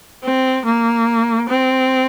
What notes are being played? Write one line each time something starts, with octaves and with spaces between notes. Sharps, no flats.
C4
A#3
C4